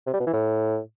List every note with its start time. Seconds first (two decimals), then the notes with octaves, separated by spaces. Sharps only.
0.07 C3
0.13 G3
0.20 B2
0.27 E3
0.33 A2